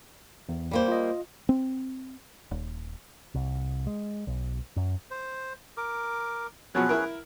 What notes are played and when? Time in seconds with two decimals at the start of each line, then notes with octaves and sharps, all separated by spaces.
0.49 E2
0.71 G3 A#3 C5
0.88 F4 D#5
1.49 C4
2.51 D#1
3.34 C2
3.87 G#3
4.27 B1
4.76 F#2
5.11 C5
5.77 A#4 D6
6.75 B2 F3 F#3 C#4 G#4 B4
6.89 E4 A#4